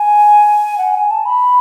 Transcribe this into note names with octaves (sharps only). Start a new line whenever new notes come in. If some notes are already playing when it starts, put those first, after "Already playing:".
Already playing: G#5
F#5
G#5
A5
B5